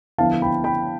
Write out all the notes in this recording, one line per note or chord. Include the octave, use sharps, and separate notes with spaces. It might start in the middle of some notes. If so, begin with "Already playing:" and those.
D3 F3 B3 E4 F5 A5
G5 B5
G5 B5